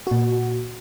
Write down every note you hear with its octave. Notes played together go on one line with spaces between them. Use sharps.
A#2 F#4